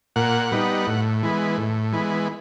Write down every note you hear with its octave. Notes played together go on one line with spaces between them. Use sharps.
A#2 F#5
G3 B3 D#4
A2
E3 G#3 B3
A2
E3 G#3 B3